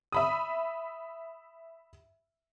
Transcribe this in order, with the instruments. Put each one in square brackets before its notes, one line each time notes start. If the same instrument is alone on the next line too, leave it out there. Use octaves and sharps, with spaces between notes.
[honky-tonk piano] E5 B5 D#6